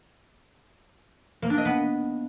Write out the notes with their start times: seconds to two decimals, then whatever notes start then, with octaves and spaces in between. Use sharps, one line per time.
1.42 A#3
1.50 D4
1.58 D#5
1.65 B3